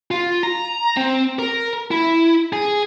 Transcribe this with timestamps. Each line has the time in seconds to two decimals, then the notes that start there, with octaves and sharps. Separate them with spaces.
0.11 F4
0.43 A#5
0.97 C4
1.39 A#4
1.91 E4
2.53 G#4